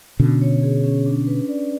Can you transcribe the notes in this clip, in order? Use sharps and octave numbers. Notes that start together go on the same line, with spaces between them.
B2 D3 C#4
C#5
G#4
C#4
D4
B4
D5